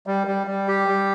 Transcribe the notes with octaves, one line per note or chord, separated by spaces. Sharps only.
G3
G3
G3
G4
G3